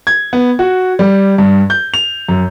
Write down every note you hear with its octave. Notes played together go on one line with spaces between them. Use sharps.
G#6
B3
F#4
G3
G2
G6
F7
F#2